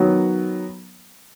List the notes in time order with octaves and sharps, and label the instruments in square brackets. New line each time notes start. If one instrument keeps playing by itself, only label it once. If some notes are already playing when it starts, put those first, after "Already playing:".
Already playing: [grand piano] D#3 F#3 B3 F#4